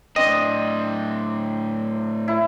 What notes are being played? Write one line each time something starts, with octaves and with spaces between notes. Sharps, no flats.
A2 C4 D4 D#5
E4